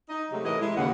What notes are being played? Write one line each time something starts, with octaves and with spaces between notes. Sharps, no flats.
D#4 D#5
C3 F#3 G#3 A3 F#4 G4
A2 E3 A#4 D#5
G#3 E4
D#2 C#3 F#5